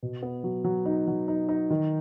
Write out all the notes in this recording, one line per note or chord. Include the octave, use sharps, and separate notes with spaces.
B2
B3
F#3
F#3
D#4
F#3
D#4
D#4
D#3